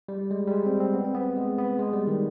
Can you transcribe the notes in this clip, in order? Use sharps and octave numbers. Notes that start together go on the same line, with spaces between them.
G3
G#3
G3
G#3
C4
C4
B3
C4
B3
G#3
B3
G#3
G3
D#3